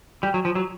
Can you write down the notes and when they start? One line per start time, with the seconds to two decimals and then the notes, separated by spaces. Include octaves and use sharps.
0.23 G3
0.34 F#3
0.45 F3
0.55 F#3